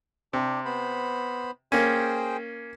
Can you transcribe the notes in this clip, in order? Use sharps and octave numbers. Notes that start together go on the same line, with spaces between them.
C3 D4 G4
B3 C5 B5
A#3 C#4 G#4 C5 G5